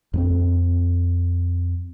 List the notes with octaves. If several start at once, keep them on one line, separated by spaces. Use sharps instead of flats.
F2 A#3 C4